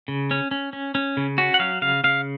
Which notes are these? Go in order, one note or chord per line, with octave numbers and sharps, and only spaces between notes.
C#3
C#4
C#4
C#4
C#4
C#3
C#4 F#4
F#5
F#3 F5
C#3 F5
C#3 F5